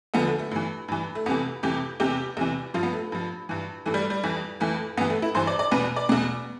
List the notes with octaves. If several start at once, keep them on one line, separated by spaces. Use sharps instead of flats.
E2 D3 F3 B3
A3
A3
G2 E3
G2 E3
A3
F2 C3 E3 B3
F2 C3 E3 G4
E2 C3 E3 G4
E2 C3 E3
G2 F3 F4
B3
A3
G2 F3
G2 E3
G2 E3 A3
G3
G3
F2 E3
F2 E3 A3
G2 E3 B3
A3
E4
G2 E3 C5
D5
D5
E2 B2 B4
D5
E2 B2